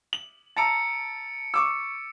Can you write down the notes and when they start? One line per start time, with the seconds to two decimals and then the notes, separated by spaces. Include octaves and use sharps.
0.13 F#7
0.56 A5 A#5 E6 A6 C#7 D7
1.54 C#6 D6 E6